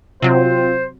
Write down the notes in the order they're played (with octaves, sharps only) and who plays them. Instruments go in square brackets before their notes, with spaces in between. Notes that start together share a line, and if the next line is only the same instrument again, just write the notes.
[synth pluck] C3 F#3 [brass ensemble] C4 F4 [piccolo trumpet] C5